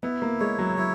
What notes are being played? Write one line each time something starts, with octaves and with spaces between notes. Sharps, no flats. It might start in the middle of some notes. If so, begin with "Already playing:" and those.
B3 E4
A#3
G#3 C#5
F#3
F#3 E4